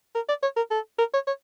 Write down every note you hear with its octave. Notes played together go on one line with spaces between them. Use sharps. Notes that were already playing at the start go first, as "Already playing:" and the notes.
A#4
D5
C#5
A#4
A4
A#4
C#5
C#5